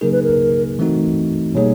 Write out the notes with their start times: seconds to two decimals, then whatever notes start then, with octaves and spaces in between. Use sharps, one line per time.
0.01 C#3 F#3 A#3 D#4 G#4 A#4
0.12 B4
0.23 A#4
0.79 E3 A3 C4 D#4 F#4
1.55 B2 G3 A#3 D#4 G#4 C#5